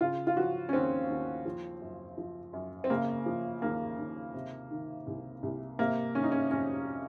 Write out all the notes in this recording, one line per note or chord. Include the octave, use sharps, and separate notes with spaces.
C#3 F4
F4
F3 F#4
C#4
D#2 C4
D#2
F3
F#2
F3
F#2
C4
C#3 A#3
F3
D#2 A#3
D#2
C3
D#3
C2
C2
C3 A#3
D#3 C#4
D#4
C#4
F2 C#4